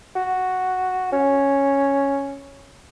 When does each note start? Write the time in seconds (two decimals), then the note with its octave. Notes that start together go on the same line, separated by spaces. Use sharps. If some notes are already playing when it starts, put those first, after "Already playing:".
0.16 F#4
1.12 C#4